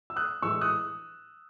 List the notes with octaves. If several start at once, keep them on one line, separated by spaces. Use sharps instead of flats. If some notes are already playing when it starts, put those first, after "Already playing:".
E6
D#6 F#6
A2 E3 G#3 C#6 E6
D#6 F#6